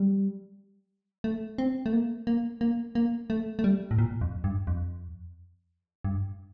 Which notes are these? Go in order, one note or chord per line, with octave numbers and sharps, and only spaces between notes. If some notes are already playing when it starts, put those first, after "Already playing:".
Already playing: G3
A3
C4
A3
A#3
A#3
A#3
A#3
A3
A3
G3
A2
A#2
F2
G2
F2
G2